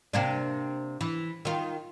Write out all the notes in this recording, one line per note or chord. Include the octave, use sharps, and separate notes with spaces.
C3 A#3 D4
E3
D#3 F4